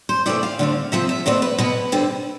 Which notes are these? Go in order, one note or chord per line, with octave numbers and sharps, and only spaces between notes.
C5
C3 E3 A3 D5
F5
D3 A3 C4 F5
C3 F3 C4 E5
E5
B2 A3 C4 D5
B4
B2 B3 B4
D3 G3 C4